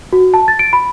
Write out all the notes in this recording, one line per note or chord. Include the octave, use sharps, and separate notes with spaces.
F#4
A5
A6
D7
B5